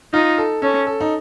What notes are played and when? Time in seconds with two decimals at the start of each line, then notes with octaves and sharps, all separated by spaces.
0.13 D#4 F4
0.38 A4
0.62 C#4 A4
0.87 A4
1.01 D#4